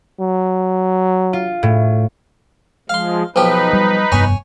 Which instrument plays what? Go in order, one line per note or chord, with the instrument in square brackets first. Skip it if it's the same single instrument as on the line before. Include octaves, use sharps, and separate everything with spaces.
[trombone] F#3
[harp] F4
A2
[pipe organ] F3 G#3 [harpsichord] F5 C6
[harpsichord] B1 F3 G4 [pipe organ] D#4 B4
[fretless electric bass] G3
[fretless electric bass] F1 G2 B3 [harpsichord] C#5 G#5